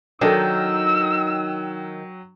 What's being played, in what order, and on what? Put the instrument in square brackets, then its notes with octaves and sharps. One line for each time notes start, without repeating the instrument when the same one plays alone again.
[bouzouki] D#3 [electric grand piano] F#3 G5 [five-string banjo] D4 A4 [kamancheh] E6